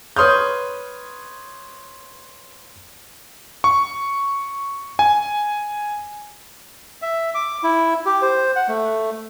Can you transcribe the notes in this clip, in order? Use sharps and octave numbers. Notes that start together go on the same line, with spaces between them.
B4 C#5 C6 D#6 F6 G6
C#6
G#5
E5
D6
E4
G4
C5
F#5
A3